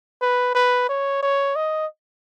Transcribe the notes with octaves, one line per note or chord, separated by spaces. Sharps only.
B4
B4
C#5
C#5
D#5